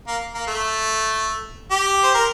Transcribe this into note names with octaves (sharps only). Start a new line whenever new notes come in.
A#3
A#3
A3
G4
C5
A#4